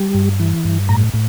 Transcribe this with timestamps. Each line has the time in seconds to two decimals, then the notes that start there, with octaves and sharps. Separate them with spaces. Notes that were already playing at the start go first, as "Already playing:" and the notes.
Already playing: G3
0.15 G2
0.40 E3
0.65 G2
0.89 A2 A#5
1.14 A2